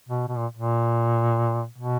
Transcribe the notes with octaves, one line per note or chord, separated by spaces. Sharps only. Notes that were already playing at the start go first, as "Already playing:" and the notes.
B2
B2
A#2
A#2
B2